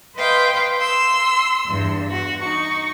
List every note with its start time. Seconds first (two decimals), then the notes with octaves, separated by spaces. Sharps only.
0.16 B4 C5 D#5 F5 G5
0.77 C6 E6
1.67 E2 G2
2.09 F#4
2.40 D#4 C#6